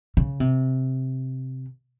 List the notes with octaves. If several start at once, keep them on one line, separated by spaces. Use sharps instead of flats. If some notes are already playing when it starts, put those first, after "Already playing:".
C#3
C3